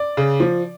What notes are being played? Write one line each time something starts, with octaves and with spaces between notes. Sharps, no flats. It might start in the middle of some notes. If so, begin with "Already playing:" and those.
Already playing: D5
C#3
F3